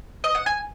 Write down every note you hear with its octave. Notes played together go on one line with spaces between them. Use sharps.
D#5
F#5
G#5